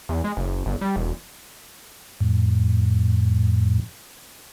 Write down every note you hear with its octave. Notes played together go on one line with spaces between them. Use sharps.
E2
G#3
F#1
G1
G3
E1
F2 A2